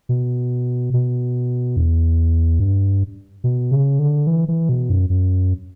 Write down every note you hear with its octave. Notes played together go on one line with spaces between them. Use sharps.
B2
B2
E2
G2
B2
C#3
D3
E3
E3
B2
F#2
F#2